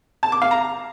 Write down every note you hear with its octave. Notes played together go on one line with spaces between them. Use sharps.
A5
D6
F5
A#5